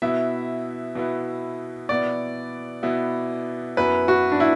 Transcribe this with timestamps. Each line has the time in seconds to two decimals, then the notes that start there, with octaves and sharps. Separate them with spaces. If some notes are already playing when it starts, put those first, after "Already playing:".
0.02 B2 B3 E4 E5
0.95 B2 B3 E4
1.89 B2 B3 E4 D5
2.83 B2 B3 E4
3.77 F#2 F#3 B3 E4 B4
4.08 F#4
4.32 D4
4.40 E4